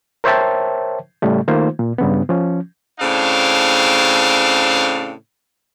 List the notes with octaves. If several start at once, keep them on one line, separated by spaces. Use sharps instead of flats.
A#4 C5 C#5 E5 G5 A5
A2 C#3 G3 A3
D#3 A3 A#3 D#4 F4 C5
A#2
G2 C#3 B3
F3 C#4
A2 C#3 C4 D4 F5